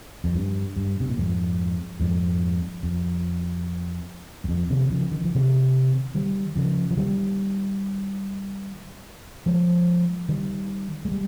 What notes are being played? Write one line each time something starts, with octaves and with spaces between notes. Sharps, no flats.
F2
G2
G2
C3
A#2
F2 G#2
F2 G#2
F2
G2
F2
C3 D#3
C#3 F3
D#3
F3
C3 D#3
D#3 G3
C#3 F3
F3
D#3 G3
F3 G#3
D#3 G3
G#3
G3